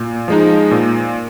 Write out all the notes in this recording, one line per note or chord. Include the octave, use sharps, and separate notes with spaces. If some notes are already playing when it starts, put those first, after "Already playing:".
Already playing: A#2
F3 G#3 D#4
A#2